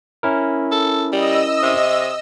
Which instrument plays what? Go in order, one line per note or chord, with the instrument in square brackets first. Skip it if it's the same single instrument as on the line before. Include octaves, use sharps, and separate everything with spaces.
[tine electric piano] C#4 E4 A#4
[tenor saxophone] A4
[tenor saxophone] G3 [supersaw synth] D#5 E6
[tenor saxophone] C3